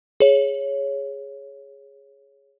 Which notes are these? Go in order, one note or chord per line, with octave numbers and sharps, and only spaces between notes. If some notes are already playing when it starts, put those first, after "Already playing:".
G#4 C#5